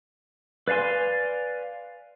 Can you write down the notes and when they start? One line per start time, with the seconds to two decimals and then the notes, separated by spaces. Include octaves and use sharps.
0.68 B4 D5 F5 G#5 C6